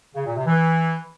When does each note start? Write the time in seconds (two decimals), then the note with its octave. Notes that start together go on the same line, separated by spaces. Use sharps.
0.15 C#3
0.25 A#2
0.36 C3
0.46 E3